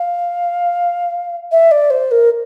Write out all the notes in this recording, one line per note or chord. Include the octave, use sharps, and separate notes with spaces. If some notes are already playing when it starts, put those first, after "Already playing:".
Already playing: F5
E5
D5
C5
A#4